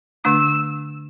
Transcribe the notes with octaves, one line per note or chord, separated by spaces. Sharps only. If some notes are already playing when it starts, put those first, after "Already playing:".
D3 A3 D4 E6